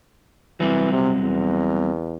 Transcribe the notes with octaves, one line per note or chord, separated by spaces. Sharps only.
E3 F#3 G3 C4
C3
E2